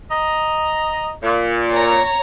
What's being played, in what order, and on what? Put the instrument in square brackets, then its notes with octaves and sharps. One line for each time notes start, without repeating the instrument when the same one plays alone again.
[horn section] D#5 A#5
A#2
[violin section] C#5 A#5